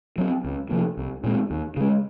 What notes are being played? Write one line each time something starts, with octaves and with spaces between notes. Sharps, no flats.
F#3 C4
C#2
C3 F3 A#3
C2
A#2 G#3 C4
D#2
C#3 G#3